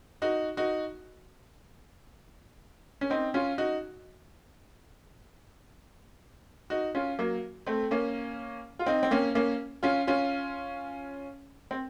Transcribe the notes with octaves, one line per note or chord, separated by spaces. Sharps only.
D#4 F#4
D#4 F#4
C#4
C4 D#4
C#4 F4
D#4 F#4
D#4 F#4
C#4 F4
F#3 A#3
A3 C4
A#3 C#4
F4
C4 D#4
C4
A#3 C#4
A#3 C#4
C#4 F4
C#4 F4
C4